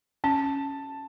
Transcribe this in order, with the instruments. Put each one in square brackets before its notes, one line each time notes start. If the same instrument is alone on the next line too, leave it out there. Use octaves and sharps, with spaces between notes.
[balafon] C#4 [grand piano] A5